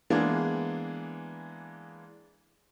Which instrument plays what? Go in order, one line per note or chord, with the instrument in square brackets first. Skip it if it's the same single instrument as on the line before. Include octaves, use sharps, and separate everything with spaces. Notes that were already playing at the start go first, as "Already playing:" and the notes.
[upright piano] E3 G#3 A#3 B3 D4 G#4